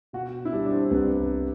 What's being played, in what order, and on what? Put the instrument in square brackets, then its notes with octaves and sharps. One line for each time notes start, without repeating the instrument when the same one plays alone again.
[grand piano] B2 [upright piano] F#4
[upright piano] E4
[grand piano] G3 [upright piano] D4
[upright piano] D4
C4
[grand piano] C2 [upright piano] B3